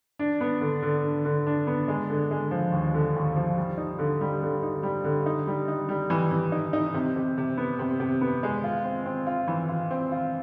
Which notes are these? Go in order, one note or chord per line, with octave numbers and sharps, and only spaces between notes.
D4
B3
D3
D3
D4
D3
D4
B3
G#3
D3
G#3
F3
D#2
D3
D#2
F3
G3
D#4
D3
G3
D3
D#4
G3
D3
D#4
G3
D#4
G3
E3
E3
D#4
D#4
C3
C3
C3
B3
C3
C3
B3
G#3
F4
C4
C4
F4
E3
F4
C4
F4